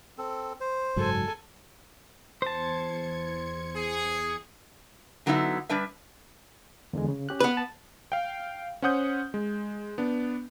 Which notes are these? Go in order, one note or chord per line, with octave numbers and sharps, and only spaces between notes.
C4 A4
C5
F#1 G#2 F#3 A4 G#5
E2 C5 A5 G#6 C#7
G#4
D3 F#3 B3 D#4 E4 E5
G3 D4 B4 E5
E2 D3 G#3
C#3
C#4 G4 F#6
B3 B4
A5
F5 G5
C#4 C5 F#5 D#6 G6
G#3
B3 D4